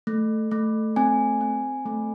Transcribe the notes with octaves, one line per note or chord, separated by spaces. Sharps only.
A3
A3
C4 G#5
C4
A3